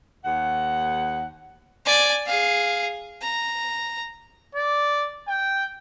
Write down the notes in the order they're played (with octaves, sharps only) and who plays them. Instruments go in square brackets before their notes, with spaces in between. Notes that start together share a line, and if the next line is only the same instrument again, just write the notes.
[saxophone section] D#2 F#5
[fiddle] D5 G#5
G#4 F5
A#5
[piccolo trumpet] D5
G5